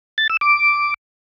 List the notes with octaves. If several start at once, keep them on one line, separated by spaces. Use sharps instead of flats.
A6
E6
D6